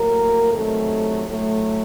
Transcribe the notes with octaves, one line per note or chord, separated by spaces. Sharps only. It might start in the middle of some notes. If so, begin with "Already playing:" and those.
Already playing: A2 F#3 A#3 A#4
C3 D#3 F#3 A3 A4
A2 F#3 A3